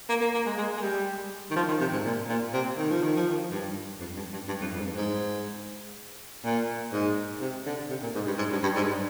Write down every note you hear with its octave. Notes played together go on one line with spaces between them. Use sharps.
A#3
A#3
A#3
G#3
G#3
G#3
G3
D#3
F3
D#3
C3
G#2
A#2
A#2
C3
D#3
F3
D#3
F3
D#3
G2
F2
G2
G2
G2
F2
F2
G#2
G2
G#2
A#2
G#2
C3
D3
C3
A#2
G#2
G2
G#2
G2
G2
G#2
G2